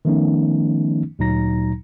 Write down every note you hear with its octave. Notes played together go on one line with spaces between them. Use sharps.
D#3 F3 A3 B3 C#4 D#4
D2 A#2 F#3 D#4 A#5 A#6